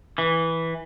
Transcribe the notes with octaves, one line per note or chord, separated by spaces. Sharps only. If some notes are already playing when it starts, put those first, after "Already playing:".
E3